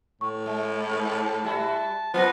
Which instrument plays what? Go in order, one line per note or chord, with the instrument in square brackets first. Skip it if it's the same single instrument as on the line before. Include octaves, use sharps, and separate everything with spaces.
[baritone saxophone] A2 [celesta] C#6
[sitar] G#3
[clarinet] A5
[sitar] G3 E4 F#4
[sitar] F3 C4 [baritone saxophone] B3 [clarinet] F4 [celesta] C5 A#6